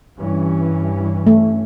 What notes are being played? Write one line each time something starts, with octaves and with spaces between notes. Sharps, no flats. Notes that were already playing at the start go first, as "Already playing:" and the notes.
G2 E3 C#4
A3